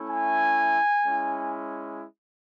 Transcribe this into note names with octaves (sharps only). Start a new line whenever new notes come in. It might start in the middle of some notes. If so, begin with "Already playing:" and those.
Already playing: A3 C#4 E4
G#5
G#3 C#4 E4